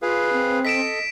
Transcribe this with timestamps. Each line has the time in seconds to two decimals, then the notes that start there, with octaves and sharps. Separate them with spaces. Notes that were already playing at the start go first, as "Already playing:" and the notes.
0.02 F4 G#4 B4 F5
0.33 C4
0.65 A4 D#5 B6 D7 E7